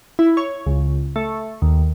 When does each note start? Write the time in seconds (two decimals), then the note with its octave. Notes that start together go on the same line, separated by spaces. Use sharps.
0.19 E4
0.37 C#5
0.66 C#2
1.16 A3
1.62 D#2